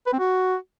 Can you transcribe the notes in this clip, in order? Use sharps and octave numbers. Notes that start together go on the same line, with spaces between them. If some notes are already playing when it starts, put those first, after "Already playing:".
B4
C4
F#4